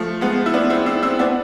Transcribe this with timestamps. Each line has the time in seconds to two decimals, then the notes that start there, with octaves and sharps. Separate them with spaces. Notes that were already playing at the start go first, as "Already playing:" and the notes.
Already playing: F3 A3
0.21 G#3 B3
0.46 E4
0.54 B3 D4
0.70 C4 E4
0.86 C4 E4
1.03 C4 E4
1.19 B3 D4